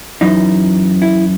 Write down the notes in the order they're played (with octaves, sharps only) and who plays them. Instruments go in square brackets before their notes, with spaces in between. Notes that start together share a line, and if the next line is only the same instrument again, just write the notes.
[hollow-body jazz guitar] F#2 E3 D#4
E4